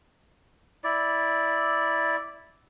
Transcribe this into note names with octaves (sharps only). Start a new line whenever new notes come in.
E4 D5